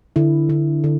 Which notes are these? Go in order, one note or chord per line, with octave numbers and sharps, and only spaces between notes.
D3 E4
D3
D3